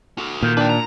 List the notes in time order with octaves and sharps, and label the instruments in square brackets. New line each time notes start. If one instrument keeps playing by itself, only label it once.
[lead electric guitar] F#4 A4
[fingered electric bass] A#2 [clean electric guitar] D#3
[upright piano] D4 [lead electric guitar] B4 G5
[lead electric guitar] A#5